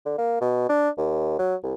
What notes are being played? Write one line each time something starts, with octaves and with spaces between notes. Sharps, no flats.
D3
A#3
B2
D4
D#2
F#3
C2